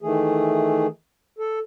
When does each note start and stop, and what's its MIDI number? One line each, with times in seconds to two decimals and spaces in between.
0.02 0.87 51
0.02 0.87 52
0.02 0.87 57
0.02 0.87 68
1.39 1.59 69